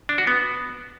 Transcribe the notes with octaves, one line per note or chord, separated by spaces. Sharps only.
D4
F#4
B3